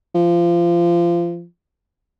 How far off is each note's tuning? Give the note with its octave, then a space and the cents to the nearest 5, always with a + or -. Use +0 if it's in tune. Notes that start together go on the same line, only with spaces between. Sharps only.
F3 -25